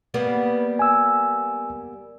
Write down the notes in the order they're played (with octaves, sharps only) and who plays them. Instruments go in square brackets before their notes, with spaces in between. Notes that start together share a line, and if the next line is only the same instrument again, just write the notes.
[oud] G3 A#3 B3
[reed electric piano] G#5 E6